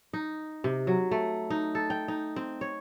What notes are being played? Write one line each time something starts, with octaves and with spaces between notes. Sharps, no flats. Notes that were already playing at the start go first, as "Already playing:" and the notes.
D#4
C3
F#3
A3
D#4
A4
G5
D#4
C4
C#5